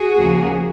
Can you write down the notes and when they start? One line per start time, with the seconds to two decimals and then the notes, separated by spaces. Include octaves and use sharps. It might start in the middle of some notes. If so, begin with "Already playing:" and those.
Already playing: F#4 G#4
0.17 D#2 C#3 F3 A#3 C#4